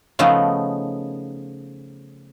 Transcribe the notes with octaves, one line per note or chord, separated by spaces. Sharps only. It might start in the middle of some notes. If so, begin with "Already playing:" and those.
C#3 F3 A3 B3 D#4